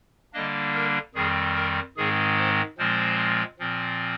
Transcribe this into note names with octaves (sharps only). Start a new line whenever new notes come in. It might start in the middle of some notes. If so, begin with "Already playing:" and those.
D3 G3 A#3 D4 D#5
A#4
F2 D#3 G3 C4 G#4
A#4
G#2 D#3 G#3 C4 G#4
C5
A#2 F3 G#3 C4 C5
A#2 F3 C4